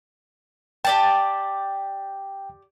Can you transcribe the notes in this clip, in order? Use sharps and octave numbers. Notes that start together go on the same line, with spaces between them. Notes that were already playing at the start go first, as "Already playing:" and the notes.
G4 D5 G5 A5